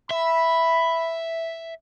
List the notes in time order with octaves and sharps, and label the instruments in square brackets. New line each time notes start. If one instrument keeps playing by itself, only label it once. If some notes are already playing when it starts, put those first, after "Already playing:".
[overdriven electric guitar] E5 [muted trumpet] B5